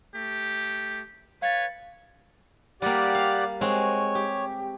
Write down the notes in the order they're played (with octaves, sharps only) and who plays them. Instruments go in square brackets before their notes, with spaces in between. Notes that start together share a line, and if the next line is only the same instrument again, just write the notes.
[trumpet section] A3 G4
[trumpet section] B4 C#5 [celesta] F5 A6
[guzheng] G3 A#3 [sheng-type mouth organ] G4 D5 F#5
[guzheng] F5
[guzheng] G#3 C4 F#4 [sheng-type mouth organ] C#5
[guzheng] G4